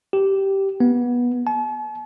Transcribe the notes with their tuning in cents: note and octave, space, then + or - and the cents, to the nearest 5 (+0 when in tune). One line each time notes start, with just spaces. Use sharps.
G4 -10
B3 -20
A5 -45